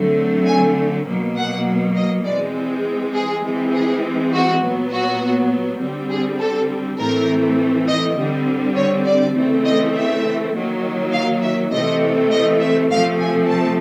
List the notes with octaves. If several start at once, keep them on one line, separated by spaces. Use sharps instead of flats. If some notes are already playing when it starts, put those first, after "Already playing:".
Already playing: D3 F#3 A3 C4
G#5
B2 F#3 A#3
F#5
D#5
E3 G#3 C4 D5
G#4
E3 G#3 C4
G#4
F#4
A#2 F#3 B3
F#4
D3 G3 C4
G#4
A4
A2 E3 A3 C4 A#4
D#5
D3 G3 C4
C#5
D5
C#3 E3 A3 C4
D#5
E5
D#3 F#3 A#3
F5
E5
C3 E3 A3 C4 D#5
D#5
E5
C3 F3 A3 C4 F5
G#5
A5